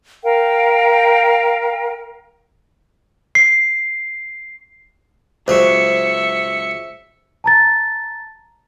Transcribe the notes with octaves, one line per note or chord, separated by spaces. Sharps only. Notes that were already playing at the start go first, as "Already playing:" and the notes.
A#4 F5 G5
C7
C#2 F#3 C5 E5 C#7
A5 A#5 A6